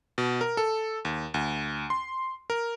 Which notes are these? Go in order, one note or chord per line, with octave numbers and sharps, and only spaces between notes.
B2
A#4
A4
D#2
D2
C6
A#4